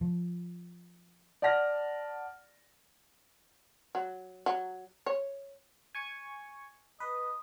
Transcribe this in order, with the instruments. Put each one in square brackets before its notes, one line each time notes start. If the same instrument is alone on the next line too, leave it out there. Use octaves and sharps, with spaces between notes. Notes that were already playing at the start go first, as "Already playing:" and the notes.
[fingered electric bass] F3
[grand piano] D5 F#5 A5 F6 A#6
[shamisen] F#3
F#3
C#5
[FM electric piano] G#5 C#6 G#6
[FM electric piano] B4 [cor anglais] D#5